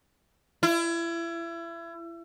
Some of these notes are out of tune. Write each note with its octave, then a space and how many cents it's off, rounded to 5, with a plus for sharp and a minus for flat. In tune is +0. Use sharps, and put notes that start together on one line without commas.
E4 +30